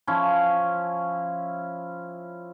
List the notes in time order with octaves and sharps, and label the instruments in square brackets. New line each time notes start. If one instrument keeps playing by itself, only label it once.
[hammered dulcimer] F3 C#4 E4